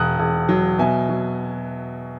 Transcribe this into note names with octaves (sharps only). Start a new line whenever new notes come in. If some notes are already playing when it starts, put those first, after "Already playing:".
Already playing: E1 D#6 F#6
E1
F#3
B2 E5 G#5
F#3